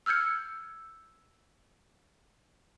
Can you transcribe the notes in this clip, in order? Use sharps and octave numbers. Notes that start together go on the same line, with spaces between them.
E6 F6 G6 G#6 C#7